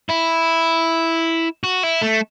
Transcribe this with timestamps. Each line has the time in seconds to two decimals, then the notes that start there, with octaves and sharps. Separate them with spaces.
0.10 E4
1.64 F#4
1.84 E4
2.02 A3